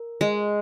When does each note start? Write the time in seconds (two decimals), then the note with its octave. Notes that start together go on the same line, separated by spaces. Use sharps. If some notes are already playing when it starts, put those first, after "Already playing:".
Already playing: A#4
0.21 G#3